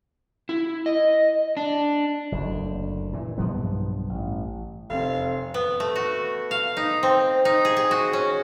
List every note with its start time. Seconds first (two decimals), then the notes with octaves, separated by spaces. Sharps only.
0.49 E4
0.86 D#5
1.57 D4
2.32 F#1 D2
3.13 A#2 E3
3.38 B1 G2 F3 B3
4.09 A1
4.90 F1 C4 F5
5.54 B3
5.80 A3
5.96 F#4
6.51 F5
6.77 D#4
7.03 C4
7.45 D#4
7.65 G#4
7.77 G#4
7.91 F#4
8.13 C#4